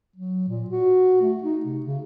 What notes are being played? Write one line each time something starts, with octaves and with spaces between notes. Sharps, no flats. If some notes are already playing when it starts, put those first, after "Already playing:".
F#3
A#2
F#4
A3
D#4
C3
C#3